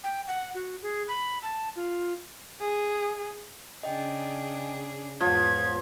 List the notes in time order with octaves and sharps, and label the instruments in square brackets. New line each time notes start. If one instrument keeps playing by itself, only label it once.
[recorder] G5
F#5
F#4
G#4
B5
A5
F4
[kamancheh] G#4
[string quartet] C#3 D4 G#4 [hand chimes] D#5 G5
[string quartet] E2 G#2 B3 [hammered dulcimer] F3 [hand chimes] C#5 [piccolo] G#6